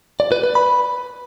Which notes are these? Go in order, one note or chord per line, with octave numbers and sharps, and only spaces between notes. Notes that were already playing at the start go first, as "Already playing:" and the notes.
D5
B4
B4
B5